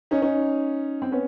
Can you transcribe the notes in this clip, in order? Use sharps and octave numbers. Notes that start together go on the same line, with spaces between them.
C#4 D#4
C#4 D#4
C4
B3 C#4